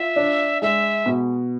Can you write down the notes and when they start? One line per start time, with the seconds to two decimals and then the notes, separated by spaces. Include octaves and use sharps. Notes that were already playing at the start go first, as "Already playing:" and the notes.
Already playing: F4 E5
0.16 D4
0.62 G#3 E5
1.06 B2